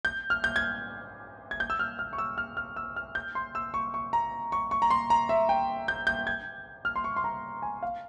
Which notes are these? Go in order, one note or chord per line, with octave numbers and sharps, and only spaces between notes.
G6
F6
G6
G#6
G#6
G6
E6
F6
F6
C#6
E6
F6
F6
E6
F6
G6
C6
E6
C#6
C#6
A#5
C#6
C#6
A#5
C6
A#5
E5
G5
G6
G6
G#6
F6
C6
C#6
C6
A#5
G#5
F5